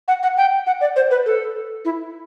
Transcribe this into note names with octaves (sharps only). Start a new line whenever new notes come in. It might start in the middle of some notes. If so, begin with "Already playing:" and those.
F#5
F#5
G5
F#5
D5
C5
B4
A4
E4